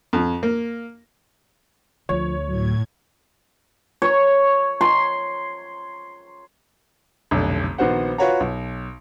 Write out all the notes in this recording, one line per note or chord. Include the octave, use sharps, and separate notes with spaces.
F2
A#3
D2 F3 C#5
A2 F#3 G#6
C#5
C6
F1 B1 D3
A#1 D#3 B3 F#4 C5 F#5
F4 F#4 B4 C#5 F#5 A#5
B1